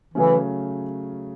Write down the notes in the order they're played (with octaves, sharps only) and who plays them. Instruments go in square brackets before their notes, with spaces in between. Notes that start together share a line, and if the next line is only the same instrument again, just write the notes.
[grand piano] C#3 F#3 A3 C#4 [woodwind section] E3